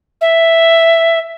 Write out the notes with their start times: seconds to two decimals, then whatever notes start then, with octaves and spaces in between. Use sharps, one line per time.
0.21 E5